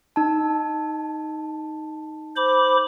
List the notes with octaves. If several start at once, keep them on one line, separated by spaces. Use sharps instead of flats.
D#4 A5
C5 B5 D6